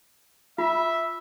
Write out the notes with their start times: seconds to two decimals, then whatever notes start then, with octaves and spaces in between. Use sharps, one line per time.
0.58 F4 E5 B5